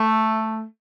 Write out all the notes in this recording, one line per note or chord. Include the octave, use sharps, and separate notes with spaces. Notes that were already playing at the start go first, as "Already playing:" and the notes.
Already playing: A3